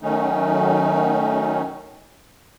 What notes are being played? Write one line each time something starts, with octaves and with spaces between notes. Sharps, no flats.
D#3 F#3 A3 C#4 D#4